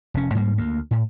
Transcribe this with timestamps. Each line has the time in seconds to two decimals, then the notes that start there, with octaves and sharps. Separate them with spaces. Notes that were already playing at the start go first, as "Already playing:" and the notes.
0.14 F1 C#4
0.35 G#2 G3 A#3
0.58 D2 A#3
0.91 A2